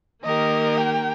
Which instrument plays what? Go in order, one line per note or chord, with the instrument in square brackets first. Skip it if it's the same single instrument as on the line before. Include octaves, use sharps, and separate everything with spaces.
[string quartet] D#3 A#3 G4 A#4 [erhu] D#5
[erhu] G5